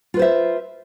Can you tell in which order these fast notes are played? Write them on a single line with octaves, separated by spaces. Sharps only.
F4 B4 C5 E5